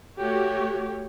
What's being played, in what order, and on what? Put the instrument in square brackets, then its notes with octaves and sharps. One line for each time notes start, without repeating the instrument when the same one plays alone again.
[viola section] A3 F#4 G4 C#5